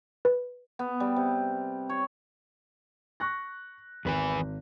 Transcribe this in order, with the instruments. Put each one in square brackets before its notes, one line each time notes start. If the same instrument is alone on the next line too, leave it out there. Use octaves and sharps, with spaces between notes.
[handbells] B4
[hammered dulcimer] B3
G3
C3
C#5
[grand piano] C#6 F#6 A#6
[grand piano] G#1 [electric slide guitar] E2 B4 G#5